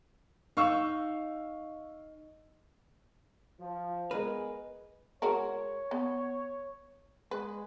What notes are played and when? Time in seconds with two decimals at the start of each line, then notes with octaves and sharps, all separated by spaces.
0.57 D#4 F5 C#6 E6
3.60 F3
4.11 G#3 B3 G#4 A#4 B4
5.22 G#3 F#4 A#4 C#5
5.91 B3
7.31 G#3 B4